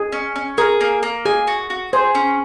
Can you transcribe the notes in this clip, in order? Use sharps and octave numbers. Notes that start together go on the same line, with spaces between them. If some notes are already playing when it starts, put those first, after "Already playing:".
Already playing: G#4
C#4
C#4
G#4 A#4
A#3
A#3
G#4 G#5
F#4
F#4
G#4 C5
C#4